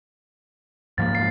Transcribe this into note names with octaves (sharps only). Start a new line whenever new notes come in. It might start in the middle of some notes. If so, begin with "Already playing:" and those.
G#2 F3 A#3 A6
C7